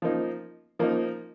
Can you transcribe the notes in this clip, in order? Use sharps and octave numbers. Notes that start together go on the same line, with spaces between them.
F3 A#3 D#4
F3 A#3 D#4